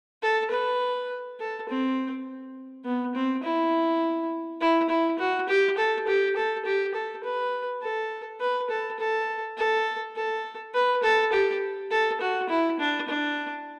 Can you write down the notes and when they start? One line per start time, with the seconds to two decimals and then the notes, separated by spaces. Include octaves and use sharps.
0.23 A4
0.51 B4
1.40 A4
1.69 C4
2.85 B3
3.15 C4
3.44 E4
4.61 E4
4.89 E4
5.19 F#4
5.49 G4
5.78 A4
6.07 G4
6.36 A4
6.65 G4
6.94 A4
7.24 B4
7.82 A4
8.41 B4
8.70 A4
8.99 A4
9.57 A4
10.16 A4
10.75 B4
11.03 A4
11.33 G4
11.91 A4
12.21 F#4
12.50 E4
12.80 D4
13.08 D4